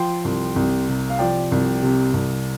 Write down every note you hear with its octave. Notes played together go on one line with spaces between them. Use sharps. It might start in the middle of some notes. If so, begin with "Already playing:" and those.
Already playing: F3 G5 C6
C2
C2
C3
F5
F3 D5 G5
C2
C3
C2